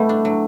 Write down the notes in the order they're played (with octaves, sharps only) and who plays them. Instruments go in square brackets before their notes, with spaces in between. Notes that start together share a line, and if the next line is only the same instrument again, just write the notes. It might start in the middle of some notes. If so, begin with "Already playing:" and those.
Already playing: [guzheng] G3 B3 E4 [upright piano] A3
[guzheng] D4
F#3